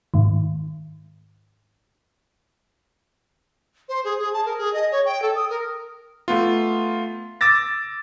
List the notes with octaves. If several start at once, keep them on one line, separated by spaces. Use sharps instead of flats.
G#2 D#3
C5
G#4
G#4
A5
A#4
G#4
D#5
C#5
G5
A4
D#6
A#4
A3 B3 F4
D6 E6 A6 A#6